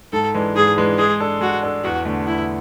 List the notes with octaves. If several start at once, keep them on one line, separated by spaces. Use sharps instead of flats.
G#2 A4
E3 G#3 D4
G#2 G#4
E3 G#3 D4
G#3 G#4
D4 A4
G#3 F#4
D4 A4
E2 F#4
D3 A3
E2 E4